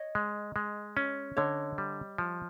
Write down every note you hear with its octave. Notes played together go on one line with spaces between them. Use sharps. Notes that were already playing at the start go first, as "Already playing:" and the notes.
Already playing: C#5 D#5
G#3
G#3
C#4
D3 C#5 D#5
G3
F3